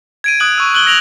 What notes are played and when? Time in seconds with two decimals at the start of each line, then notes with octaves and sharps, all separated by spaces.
0.24 G#6 D7 D#7
0.40 D#6 F#6 G#6 F#7
0.58 C#6 E6
0.73 E6 F#6 F#7 G7
0.86 E6 A#6 D7 F7 F#7